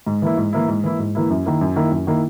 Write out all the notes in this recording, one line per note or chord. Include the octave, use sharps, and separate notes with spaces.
G#2
E3 A#3 E4
G#2
E3 A#3 E4
G#2
E3 A#3 E4
G#2
E3 A#3 E4
F#2
D#3 A#3 E4
F#2
D#3 A#3 E4
F#2
D#3 A#3 E4